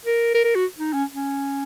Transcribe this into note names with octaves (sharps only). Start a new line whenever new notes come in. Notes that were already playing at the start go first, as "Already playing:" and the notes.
A#4
A#4
A#4
F#4
D#4
C#4
C#4